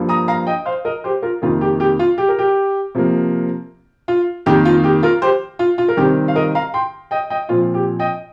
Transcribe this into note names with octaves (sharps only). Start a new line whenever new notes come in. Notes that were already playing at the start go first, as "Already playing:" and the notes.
Already playing: G2 F3 A#3
A#5 D#6
F5 A#5
D#5 G5
C5 F5
A#4 D#5
G4 C5
F4 A#4
F2 C3 D#3 A#3 F4
G4
G4
F4
G4
A#4
G4
C3 F3 A#3
F4
F2 D#3 A#3 G4
F4
G4
F4 A#4
G4 C5
F4
F4
A#4
C3 D#3 G3 C4 G4
F5
A#4 D#5
F5 A#5
G5 C6
D#5 G5
D#5 G5
A#2 F3 C4 F4
G4
D#5 G5